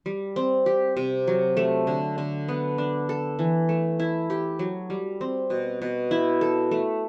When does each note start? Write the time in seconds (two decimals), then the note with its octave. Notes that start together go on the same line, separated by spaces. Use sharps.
0.06 G3
0.36 C4
0.66 G4
0.97 C3
1.27 F#3
1.57 A3
1.87 D3
2.18 D3
2.48 B3
2.78 D4
3.09 A4
3.39 E3
3.69 A3
4.00 E4
4.30 G4
4.59 F#3
4.90 G3
5.21 C4
5.50 B2
5.82 B2
6.11 E4
6.41 A4
6.71 A3